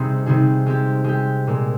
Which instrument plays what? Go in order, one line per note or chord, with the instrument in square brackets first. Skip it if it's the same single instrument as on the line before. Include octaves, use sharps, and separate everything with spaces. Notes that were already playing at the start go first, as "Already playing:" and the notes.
Already playing: [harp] C3 G3 C4 D#4 G#4
C3 G3 C4 D#4 G#4
G#3 C4 G4
G#3 C4 G4
A#2 G#3 C4